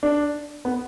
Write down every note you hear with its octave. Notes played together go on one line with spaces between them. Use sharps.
D4
B3